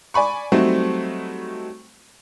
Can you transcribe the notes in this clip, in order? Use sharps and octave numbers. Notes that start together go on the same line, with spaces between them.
D5 G#5 B5 C#6
F#3 G3 A3 C4 D#4 F#4